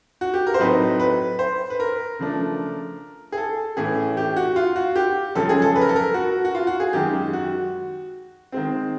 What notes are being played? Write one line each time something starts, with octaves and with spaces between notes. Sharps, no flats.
F#4
G4
A#4
C5
A2 F#3 A3 C4 D#4 B4
B4
C5
B4
A#4
C#3 F3 A3 D4
G#4
A4
A2 E3 A3 C#4 G#4
G4
F#4
F4
F#4
G4
F#2 C#3 F3 G#3 C#4 A4
G#4
A4
B4
A#4
A4
A#4
F#4
F#4
F4
F#4
G#4
F#2 D#3 G#3 G4
F#4
D#3 G#3 C4